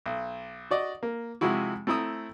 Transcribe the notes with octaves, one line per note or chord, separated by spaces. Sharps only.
B1
F#4 D5 D#5
A#3
C3 F3 G#3 E4 F#4
A3 C4 E4 A#5 D#6 E6